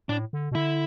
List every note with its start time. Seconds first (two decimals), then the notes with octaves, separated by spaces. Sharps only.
0.09 A2 D4
0.33 D3
0.52 B2
0.55 D3 E4